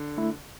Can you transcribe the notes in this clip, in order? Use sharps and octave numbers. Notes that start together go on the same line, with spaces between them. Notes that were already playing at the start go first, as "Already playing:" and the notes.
Already playing: D3
A3 E4